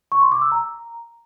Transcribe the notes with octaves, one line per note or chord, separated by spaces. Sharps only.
C#6
C6
D6
E6
A#5